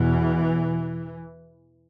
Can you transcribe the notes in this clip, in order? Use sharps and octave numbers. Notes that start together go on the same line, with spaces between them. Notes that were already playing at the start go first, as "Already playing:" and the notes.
Already playing: E2 B2 E3